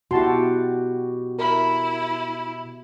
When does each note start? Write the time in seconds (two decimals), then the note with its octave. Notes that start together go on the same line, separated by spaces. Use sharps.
0.11 B2 E4 F#4 G4 A5 C6
1.39 E4 A#4 B5